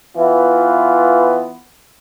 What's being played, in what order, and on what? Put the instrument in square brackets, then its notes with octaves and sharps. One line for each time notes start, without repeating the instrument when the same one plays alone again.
[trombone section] E3 B3 F4